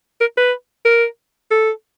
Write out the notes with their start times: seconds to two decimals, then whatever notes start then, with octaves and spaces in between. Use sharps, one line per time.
0.20 A#4
0.37 B4
0.85 A#4
1.51 A4